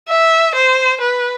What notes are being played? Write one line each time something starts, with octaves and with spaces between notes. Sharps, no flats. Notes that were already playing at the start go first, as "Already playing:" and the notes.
E5
C5
B4